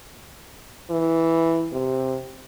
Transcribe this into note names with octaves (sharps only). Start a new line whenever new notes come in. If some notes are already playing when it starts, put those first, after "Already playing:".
E3
C3